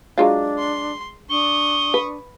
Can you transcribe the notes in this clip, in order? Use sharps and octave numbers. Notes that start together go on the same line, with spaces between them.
F#3 G#3 D4 F4
C6
D4 C#6 D#6 G7
B4